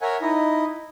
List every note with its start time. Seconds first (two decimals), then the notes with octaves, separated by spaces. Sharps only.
0.01 A#4 C#5 E5 F#5 G#5
0.21 D#4 E4 D#5